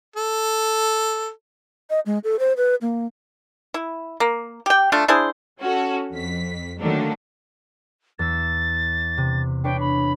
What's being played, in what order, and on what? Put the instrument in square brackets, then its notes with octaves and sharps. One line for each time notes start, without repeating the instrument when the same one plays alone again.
[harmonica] A4
[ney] D#5
G#3
A4
C5
B4
A#3
[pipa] E4
A#3
G4 G5
A3 D4 F4
D4 E4 G#4 C5
[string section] C#4 F#4 A4
F2 B6
D3 D#3 F#3 A3 A#3 D4
[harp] E2 E6 [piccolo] A6
[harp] C3
[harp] D4 B4 C#5 [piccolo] G5
[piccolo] B5